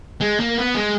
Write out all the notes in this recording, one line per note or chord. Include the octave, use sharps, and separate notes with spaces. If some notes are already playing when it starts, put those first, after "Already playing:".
G#3
A#3
B3
G#3